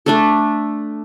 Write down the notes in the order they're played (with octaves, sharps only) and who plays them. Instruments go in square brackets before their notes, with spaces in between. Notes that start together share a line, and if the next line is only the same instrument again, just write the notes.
[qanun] A3 D4 A4